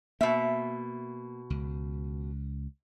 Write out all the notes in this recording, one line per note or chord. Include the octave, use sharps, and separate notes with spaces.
B2 A#3 E5
C#2